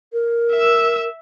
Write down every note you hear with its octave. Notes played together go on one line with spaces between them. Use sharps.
A#4
E5 E6